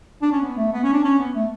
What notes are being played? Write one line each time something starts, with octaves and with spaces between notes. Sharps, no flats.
D4
C#4
B3
A3
B3
C#4
D4
C#4
B3
A3